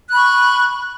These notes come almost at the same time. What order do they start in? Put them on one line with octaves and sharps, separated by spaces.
F#6 B5 C#6